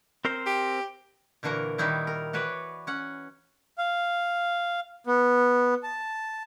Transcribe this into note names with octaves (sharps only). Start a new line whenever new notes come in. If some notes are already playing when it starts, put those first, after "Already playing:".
C4 A#4 C5
G4
A#2 D3 E3 F#4 A#4 A#5
D#3 G3 D#4 E4 F#4
A#4
E3 F#4 B4 C#5 D5
C#4 F#5
F5
B3
A5